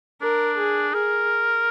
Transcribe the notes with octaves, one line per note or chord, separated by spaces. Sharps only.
D4 A#4
G#4
G#4 A#4